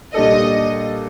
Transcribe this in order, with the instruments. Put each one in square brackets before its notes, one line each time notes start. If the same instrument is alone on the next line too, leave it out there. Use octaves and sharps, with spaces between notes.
[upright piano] A#2 G3 D4 A4 [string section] D#5